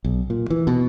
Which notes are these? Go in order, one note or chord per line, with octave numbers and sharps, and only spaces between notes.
B1
A#2
E3
B2